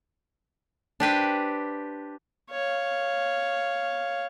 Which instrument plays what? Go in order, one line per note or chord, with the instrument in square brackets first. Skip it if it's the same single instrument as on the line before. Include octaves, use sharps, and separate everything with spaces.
[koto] D4 G4 B4 C5
[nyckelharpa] C#5 F5